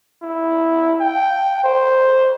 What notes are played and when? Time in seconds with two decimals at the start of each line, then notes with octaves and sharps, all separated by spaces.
0.23 E4
1.01 G5
1.64 C5